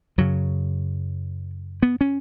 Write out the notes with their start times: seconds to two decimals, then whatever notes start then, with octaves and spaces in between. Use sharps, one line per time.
0.18 F#2 C#3 F#3
1.83 B3
2.01 C#4